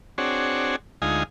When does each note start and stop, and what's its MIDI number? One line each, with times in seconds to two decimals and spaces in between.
0.18 0.76 60
0.18 0.76 62
0.18 0.76 66
0.18 0.76 68
0.18 0.76 73
1.02 1.23 38
1.02 1.23 56
1.02 1.23 63
1.02 1.23 65
1.02 1.23 80
1.02 1.23 87